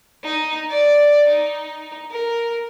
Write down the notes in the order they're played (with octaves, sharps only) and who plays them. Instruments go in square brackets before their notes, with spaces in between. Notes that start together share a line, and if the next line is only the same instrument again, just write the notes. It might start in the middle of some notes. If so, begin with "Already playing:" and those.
[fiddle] D#4
D5
D#4
A#4